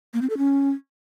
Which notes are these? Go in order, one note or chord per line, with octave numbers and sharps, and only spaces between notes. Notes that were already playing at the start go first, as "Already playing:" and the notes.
A#3
C4
A4
C#4